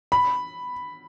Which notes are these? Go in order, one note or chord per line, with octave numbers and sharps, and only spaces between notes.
B5